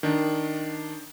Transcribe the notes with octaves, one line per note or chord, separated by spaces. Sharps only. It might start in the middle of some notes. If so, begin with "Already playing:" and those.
D#3 D4